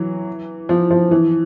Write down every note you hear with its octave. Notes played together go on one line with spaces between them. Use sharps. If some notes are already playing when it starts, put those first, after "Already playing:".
Already playing: E3 F#3
F3
F3
E3